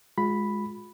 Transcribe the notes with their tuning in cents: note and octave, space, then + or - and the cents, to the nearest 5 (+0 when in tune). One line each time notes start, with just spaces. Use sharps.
G#3 +0 F4 +40 B5 +0